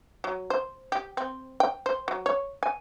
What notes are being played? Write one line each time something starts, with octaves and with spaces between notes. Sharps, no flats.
F#3
C5
G4
C4
G5
C5
F#3
C#5
G#5